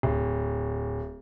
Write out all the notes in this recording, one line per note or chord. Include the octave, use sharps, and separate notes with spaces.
D1